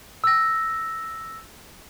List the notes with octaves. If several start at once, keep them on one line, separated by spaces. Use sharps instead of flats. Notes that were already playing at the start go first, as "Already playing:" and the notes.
E6 A#6